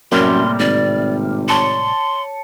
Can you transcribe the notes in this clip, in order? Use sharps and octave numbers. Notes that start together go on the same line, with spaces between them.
F#2 A2 C3 G3 A#3 C6 F6
G#1 D5
C#5 A5 C6 C#7